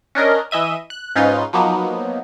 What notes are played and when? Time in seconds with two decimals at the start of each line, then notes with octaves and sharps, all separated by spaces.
0.15 C#4 D4 A#4 D#5
0.51 E3 D#5 E5 D#7
0.90 F#6
1.16 G#2 C#4 D#4 F4 B4 C6
1.53 F3 F#3 A#3 B3 D#4